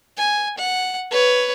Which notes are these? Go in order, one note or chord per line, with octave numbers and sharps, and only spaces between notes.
G#5
F#5
B4 C#5